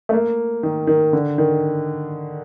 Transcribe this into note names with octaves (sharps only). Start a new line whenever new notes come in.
A3
A#3
D#3
D#3
D3
D#3